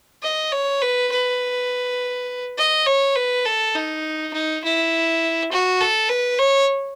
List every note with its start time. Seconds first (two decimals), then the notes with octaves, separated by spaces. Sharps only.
0.23 D#5
0.52 C#5
0.82 B4
1.11 B4
2.58 D#5
2.86 C#5
3.16 B4
3.46 A4
3.75 D#4
4.33 D#4
4.64 E4
5.51 F#4
5.81 A4
6.09 B4
6.38 C#5